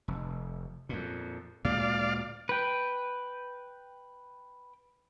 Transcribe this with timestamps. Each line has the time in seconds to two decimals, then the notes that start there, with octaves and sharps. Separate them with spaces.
0.08 F1
0.89 F2 A#2
1.65 D2 A#2 G#3 D5 F5
2.49 B4 G5